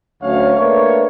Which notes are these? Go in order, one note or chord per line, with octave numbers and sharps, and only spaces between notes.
D2 F#3 A3 C#4 C#5 F5
A3 A#3 D4 B4 C#5